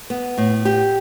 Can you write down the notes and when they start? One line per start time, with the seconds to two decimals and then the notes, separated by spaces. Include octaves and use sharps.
0.10 B3
0.38 A2
0.65 G4